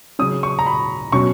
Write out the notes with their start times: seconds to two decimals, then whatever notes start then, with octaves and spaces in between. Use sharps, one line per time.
0.19 C#3 F#3 C#4 D#6
0.43 C#6
0.59 A#5
0.66 B5
1.12 B2 F#3 C#4 C#6